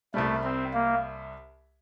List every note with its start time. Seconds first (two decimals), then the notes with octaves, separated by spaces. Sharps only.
0.14 C2 C3 G3 A3
0.44 C4
0.74 A#3